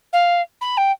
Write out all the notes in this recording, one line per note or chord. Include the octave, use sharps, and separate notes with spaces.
F5
B5
G5